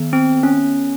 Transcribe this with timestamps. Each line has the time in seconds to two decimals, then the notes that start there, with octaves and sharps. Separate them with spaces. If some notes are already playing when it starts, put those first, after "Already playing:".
Already playing: D#3 B3
0.13 C4
0.43 C#4